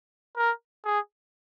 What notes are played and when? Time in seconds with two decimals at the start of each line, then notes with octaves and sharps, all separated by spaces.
0.37 A#4
0.85 G#4